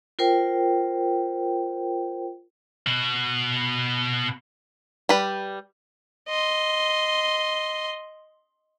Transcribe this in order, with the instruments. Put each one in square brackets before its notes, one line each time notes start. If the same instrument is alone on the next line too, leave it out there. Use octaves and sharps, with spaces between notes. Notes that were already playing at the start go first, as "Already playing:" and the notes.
[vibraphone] F4 A#4 C5 G5
[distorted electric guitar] B2 F#4
[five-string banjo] G3 B4
[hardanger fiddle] D#5 C6